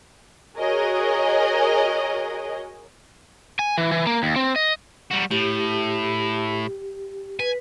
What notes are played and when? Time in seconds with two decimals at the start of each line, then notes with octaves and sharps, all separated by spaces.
0.57 F#4 G#4 A#4 C#5 D#5
3.59 G#5
3.78 E3
3.92 E3
4.07 A#3
4.23 D#2
4.36 C4
4.56 D#5
5.11 G3 F#4
5.31 A2 G4
7.40 B4 G#5